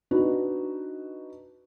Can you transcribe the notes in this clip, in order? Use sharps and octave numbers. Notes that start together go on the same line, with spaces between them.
D4 D#4 F#4 B4